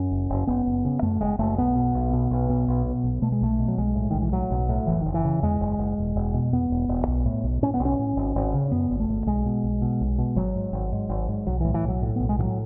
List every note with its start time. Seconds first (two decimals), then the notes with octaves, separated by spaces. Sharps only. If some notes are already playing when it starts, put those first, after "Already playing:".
Already playing: F#2 C#4
0.11 F#1
0.30 F#1
0.47 F#1 B3
0.66 F#1
0.85 C#3
1.02 F#2 A3
1.21 F#1 G#3
1.39 F#1 A3
1.58 B1 B3
1.76 B2
1.95 B1
2.13 B2
2.31 B1
2.50 B2
2.68 B1
2.86 B2
3.04 B1
3.22 B2 A3
3.32 G#3
3.41 B1 A3
3.59 B2
3.68 F#3
3.78 B1 G#3
3.95 A2
4.11 B1 D#3
4.21 E3
4.32 A2 F#3
4.51 B1
4.69 A2
4.87 F#1 E3
5.01 F#1 D#3
5.14 E3
5.24 C#3
5.43 E2 G#3
5.61 F#1
5.78 F#1
5.98 E1
6.16 E1
6.34 B2
6.52 E2 B3
6.70 E1
6.89 E1
7.07 B1
7.25 A2
7.44 B1
7.62 A2 C#4
7.74 B3
7.80 B1
7.85 C#4
7.99 A2
8.17 G#1
8.36 G#1
8.54 C#3
8.71 F#2 B3
8.91 G#1
9.00 A3
9.09 G#1
9.26 B1 G#3
9.46 B2
9.64 B1
9.82 B2
10.01 B1
10.18 B2
10.36 G#1 F#3
10.56 G#2
10.73 G#1
10.92 G#2
11.09 G#1
11.28 G#2
11.47 B1 F#3
11.60 A2 E3
11.74 E3
11.84 B1 F#3
12.02 A2
12.16 B1 B3
12.29 G#3
12.38 A2 E3
12.43 F#3